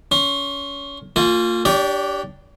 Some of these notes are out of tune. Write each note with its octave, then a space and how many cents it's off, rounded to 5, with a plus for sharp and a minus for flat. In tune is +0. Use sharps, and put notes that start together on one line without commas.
C#4 +25 C6 +40
A#3 -35 F4 +15 G#5 +0
D4 +0 G4 -5 C#5 +40